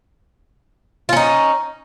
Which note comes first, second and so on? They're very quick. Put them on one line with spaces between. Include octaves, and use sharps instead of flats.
F4 C#4 D#4